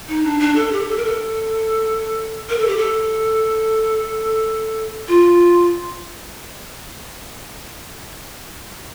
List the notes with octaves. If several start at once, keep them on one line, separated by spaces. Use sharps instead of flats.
D#4
D4
D4
A4
G4
A4
A#4
A4
A#4
A4
G4
A4
F4